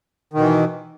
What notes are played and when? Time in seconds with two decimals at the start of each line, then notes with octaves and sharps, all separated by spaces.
0.33 D#3
0.37 B2
0.41 E3